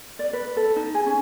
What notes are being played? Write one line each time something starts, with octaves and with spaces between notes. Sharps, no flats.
D5
B4
A4
D#4
G#4
C#4